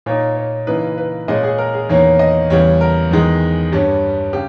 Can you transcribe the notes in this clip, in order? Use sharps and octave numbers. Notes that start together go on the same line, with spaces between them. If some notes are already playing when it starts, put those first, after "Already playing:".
A#2 A#3 D#4 C#5
C#5
C#3 E3 A#3 D#4 B4
B4
A#2 G#3 C#4 D#5
G#4
A#4
G#4
E2 D#3 A#3 C#4 C#5
D#5
E2 C#3 G3 C#5
A#4
E2 D#3 G#3 D#4
G2 G3 C#4
C#3 G4